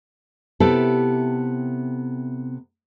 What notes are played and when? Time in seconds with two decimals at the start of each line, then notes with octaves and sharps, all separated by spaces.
0.60 C3 B3 E4 G4 A4